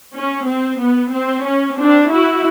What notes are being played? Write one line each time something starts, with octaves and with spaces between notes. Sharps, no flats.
C#4
C4
B3
C4
C#4
C4 D4
E4 F#4